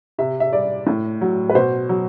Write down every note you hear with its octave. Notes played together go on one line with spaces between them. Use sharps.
C3 E5
E5
G3 D5
A2
F#3
B4
B2 C5
F#3